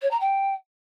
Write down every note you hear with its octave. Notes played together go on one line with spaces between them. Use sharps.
C#5
A#5
G5